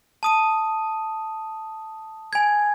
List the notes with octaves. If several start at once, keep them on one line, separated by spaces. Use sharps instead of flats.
A5 D#6 D#7
G#5 G#6